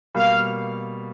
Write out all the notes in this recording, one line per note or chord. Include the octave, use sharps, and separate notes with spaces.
B2 G3 A#3 F5